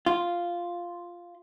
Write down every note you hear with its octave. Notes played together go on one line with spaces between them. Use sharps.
F4